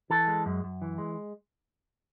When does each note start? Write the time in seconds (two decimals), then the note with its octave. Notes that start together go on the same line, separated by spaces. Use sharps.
0.10 E3 A4
0.27 G#3
0.46 F#2
0.64 F#2
0.82 E3
0.98 G#3